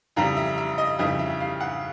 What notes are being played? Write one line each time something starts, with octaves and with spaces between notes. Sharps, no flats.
F2 C#3 E3 G3 A#5
E5
E5
D#5
F2 C#3 E3 G3 D#5
E5
F5
F#5